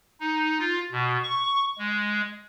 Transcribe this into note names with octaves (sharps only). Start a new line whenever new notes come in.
D#4
F4
B2
C#6
G#3